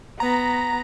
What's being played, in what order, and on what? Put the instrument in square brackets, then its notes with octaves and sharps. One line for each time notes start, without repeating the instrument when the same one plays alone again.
[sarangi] B3 [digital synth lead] A#5